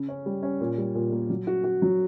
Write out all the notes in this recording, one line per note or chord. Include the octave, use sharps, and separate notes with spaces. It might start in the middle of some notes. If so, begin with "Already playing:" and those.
Already playing: C#3
C#4
G3
C#4
A#2
G3
A#2
A#3
F#3
F#4
F#4
F#3